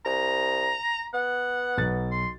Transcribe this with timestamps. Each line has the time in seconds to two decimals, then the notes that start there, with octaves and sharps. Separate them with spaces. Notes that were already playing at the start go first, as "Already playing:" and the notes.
0.06 C2 A#5
1.14 B3 F#5
1.77 B1 A6
2.11 C6